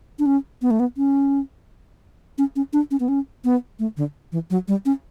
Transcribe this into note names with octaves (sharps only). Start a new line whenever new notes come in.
D4
C#4
B3
A3
B3
C#4
C#4
C#4
D4
C#4
B3
C#4
B3
A3
D3
E3
F#3
G3
C#4